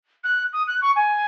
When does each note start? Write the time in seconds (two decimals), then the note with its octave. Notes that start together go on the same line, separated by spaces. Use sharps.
0.24 F#6
0.53 D#6
0.68 F#6
0.82 C#6
0.96 G#5